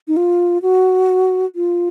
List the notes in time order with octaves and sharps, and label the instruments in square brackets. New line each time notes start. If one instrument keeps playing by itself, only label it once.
[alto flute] D#4
F4
F#4
F4